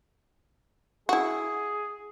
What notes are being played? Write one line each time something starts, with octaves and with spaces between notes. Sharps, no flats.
E4 F#4 G#4